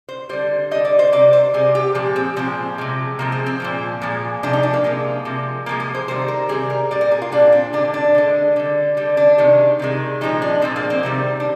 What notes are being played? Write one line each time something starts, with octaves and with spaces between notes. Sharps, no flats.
C5
D3 G3 C5
D3 G3 D#5
D5
C5
C3 G3 D5
C5
C3 G3 G#4
G4
A#2 F3 G#3
C4
A#2 F3 G#3 C4
C3 F3 G#3
C3 F3 G#3 A#3
C4
C4
A#2 F3 G#3
A#2 F3 G#3
C3 F3 G#3 D4
D#4
D4
A#3
C3 F3 G#3
C3 F3 G#3
C3 F3 G#3 A#3
G#4
C5
C3 D#3 G3 C5
A#4
C3 D#3 G3 G#4
A#4
A#2 G3 D5
A#4
G#4
F4
A#2 G3 D4
C4
D3 G#3 D4
D4
D3 G#3
D3 G3
D3 G3
D4
C3 D#3 G#3
C3 D#3 G#3
A#2 F3 G#3 D#4
D4
A#2 F3 G#3 C4
A#3
C4
C3 D#3 G3
D4